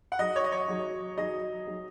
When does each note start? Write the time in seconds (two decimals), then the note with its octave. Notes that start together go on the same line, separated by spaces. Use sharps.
0.12 F#5
0.19 F#3 D#4 G#4 D#5
0.36 C#5
0.44 D#5
0.52 C#5
0.68 F#3 D#4 G#4
1.17 F#3 D#4 G#4 D#5
1.67 F#3 D#4 G#4